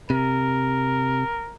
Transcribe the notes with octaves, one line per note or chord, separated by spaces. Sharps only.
C3 A#4